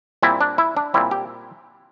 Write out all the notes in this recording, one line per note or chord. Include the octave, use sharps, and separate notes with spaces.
A#2 G3 C4 E4
D4
E4
D4
A#2 G3 C4 E4
G4